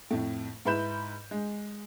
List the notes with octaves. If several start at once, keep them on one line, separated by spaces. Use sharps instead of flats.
F2 A2
G#2 E4 B4 B5 G6 E7
G#3